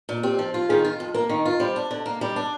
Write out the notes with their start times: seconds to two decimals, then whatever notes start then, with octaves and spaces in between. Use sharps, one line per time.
0.09 A#2
0.23 C4 G4
0.39 F3
0.54 F4
0.69 D#3 G#4
0.85 F4
1.00 F2
1.14 A#3 A#4
1.30 D#3
1.45 F4
1.60 G3 C5
1.76 D4
1.91 D3
2.06 A#3
2.21 G3
2.36 D4